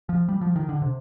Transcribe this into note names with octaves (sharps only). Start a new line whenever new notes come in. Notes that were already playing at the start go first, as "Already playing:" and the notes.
F3
G3
F3
D#3
D3
C3